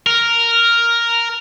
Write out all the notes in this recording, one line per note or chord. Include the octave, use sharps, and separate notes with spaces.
A#4